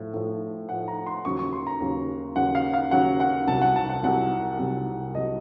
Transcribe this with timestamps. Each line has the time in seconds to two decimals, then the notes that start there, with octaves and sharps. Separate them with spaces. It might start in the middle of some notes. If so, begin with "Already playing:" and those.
Already playing: A2 F3
0.14 A2 F3
0.69 A2 F3 F#5
0.88 A#5
1.07 C6
1.25 D#2 C#3 F#3 C#6
1.39 C#6
1.53 C6
1.67 A#5
1.80 D#2 C#3 F#3
2.36 D#2 C#3 F#3 F#5
2.55 F5
2.73 F5
2.91 D#2 C#3 F#3 F#5
3.20 F#5
3.47 C2 C3 F#3 A5
3.62 F#5
3.76 A5
3.89 F#5
4.03 C2 C3 F#3 F#5
4.59 C2 C3 F#3
5.15 C2 C3 F#3 D#5